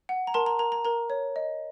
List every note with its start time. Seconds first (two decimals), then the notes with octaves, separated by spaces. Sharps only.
0.09 F#5
0.27 A#5
0.34 A#4 A5 C6
0.46 A#5
0.59 A#4 A#5
0.72 A#5
0.85 A#4 A#5
1.10 C#5
1.36 D#5